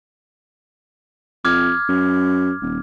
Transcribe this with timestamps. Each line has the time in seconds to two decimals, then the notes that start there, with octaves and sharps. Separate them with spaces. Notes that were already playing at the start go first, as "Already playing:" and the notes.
1.45 F2 D6 F6 G#6
1.89 F#2
2.61 D#1